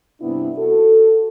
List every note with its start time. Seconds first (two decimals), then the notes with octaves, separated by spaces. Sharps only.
0.21 G2 C3 B3 D4 E4
0.58 F#4 A4